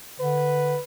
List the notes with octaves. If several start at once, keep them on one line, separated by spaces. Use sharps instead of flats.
D3 B4